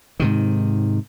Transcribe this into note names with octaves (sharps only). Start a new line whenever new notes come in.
G#2 C3 D#3